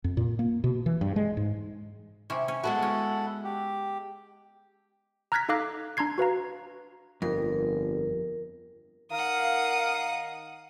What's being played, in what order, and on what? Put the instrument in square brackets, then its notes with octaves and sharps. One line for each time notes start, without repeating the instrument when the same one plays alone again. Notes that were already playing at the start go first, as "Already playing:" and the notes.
[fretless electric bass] F2
A#2
A#3
B2
E3
G2
G#3
G#2
[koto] C3 C#4 [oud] E4
[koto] C#4
[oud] G#3 B3 F#4 [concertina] E4 A4 F#5
[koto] C#4
[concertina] G4
[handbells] A#5 F6 F#6 G#6 A#6 B6
D#4 A4 F5 D6 F#6 A#6
D4 A#5 C6 G#6 C7
F#4 B4 F5 A#5
[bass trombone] G1 [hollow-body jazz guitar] F2 [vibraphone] A#4
[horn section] D#3 A#4 F5 [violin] F#5 D#6